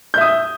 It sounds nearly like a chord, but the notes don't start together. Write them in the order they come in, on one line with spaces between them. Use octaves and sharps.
G6 E5 D#6